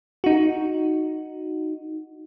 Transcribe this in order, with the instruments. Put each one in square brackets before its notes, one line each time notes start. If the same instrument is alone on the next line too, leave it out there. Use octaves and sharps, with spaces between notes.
[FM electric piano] D#4 F#4